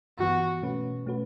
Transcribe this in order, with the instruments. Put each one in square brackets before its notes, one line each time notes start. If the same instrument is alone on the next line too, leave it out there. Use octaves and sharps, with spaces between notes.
[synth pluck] G2 E3 B3 [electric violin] F#4
[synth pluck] B2 A3 C#4 F#4 B4
B2 A3 C#4 F#4 B4